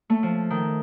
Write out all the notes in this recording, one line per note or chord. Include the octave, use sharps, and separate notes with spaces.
A3
F3
D#3